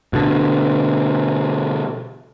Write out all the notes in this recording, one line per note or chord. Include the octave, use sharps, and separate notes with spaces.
B2 D3